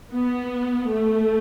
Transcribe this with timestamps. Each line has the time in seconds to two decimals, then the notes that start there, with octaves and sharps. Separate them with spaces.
0.11 B3
0.87 A3